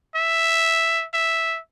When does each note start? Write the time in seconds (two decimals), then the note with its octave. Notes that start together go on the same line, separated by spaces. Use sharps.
0.16 E5
1.14 E5